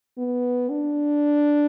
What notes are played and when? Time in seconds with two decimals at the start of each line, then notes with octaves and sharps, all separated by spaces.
0.18 B3
0.70 D4